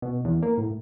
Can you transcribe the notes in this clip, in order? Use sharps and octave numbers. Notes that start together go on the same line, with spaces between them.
B2
E2
A#3
A2